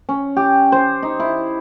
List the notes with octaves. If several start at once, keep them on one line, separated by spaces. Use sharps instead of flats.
C#4
G4
C5
D#4
E4